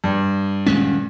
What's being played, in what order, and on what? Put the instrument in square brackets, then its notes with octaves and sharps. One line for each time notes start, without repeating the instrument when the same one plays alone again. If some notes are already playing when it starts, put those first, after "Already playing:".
[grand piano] G2
[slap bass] D#1 G#3 C#4